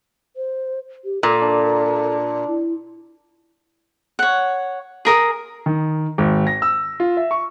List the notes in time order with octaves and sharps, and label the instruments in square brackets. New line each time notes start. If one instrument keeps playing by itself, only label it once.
[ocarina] C5
G4
[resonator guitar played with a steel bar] A#2 [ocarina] A4
[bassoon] D4
[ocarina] E4
[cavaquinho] C#5 F#5
G#4 A#4 D#6
[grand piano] D#3
G#1
A#6
E6
F4
E5
C#6